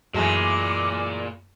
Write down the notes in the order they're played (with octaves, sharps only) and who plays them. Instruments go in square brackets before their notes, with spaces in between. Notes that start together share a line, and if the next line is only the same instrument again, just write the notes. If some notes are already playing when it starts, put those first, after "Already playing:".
[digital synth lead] F#2 [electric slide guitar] A#2 [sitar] E3 G#3 A3 [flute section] D6